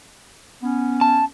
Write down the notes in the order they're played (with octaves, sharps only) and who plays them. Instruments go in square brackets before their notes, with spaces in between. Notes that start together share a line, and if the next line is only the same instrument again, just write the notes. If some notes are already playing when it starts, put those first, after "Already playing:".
[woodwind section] B3 C#4
[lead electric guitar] A5